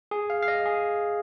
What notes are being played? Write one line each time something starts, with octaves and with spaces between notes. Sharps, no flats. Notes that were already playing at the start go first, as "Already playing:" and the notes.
G#4
F5
F5
D#5
G#4